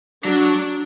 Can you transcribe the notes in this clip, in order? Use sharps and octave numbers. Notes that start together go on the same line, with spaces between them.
F#3 D4